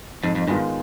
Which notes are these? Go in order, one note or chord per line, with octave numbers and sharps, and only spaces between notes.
F2 G#2
F2
G2 D#3 G#3 B3 F4